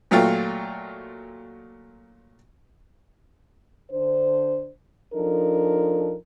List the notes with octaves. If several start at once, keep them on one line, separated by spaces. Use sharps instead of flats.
A#2 F#3 A3 F4 G5
D3 D4 C5
F3 D4 D#4 A4 A#4